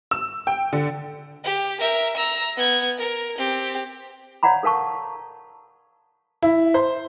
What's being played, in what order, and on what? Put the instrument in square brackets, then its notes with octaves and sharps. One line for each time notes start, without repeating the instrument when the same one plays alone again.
[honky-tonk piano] E6
G5
D3
[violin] G4
A#4 E5
A#5 E6
B3 G#6
A#4
C4 G4
[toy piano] C#5 D5 F5 F#5 A#5 B5
A4 A#4 F5 A5 C#6
[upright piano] E4
C5